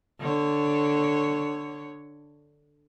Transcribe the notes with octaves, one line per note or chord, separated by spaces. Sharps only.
D3 C#5